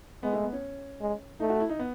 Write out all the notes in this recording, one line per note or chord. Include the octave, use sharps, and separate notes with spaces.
G#3 B3
A3
B3
C#4
G#3
A3 D#4
F#4
E4
D#4
B3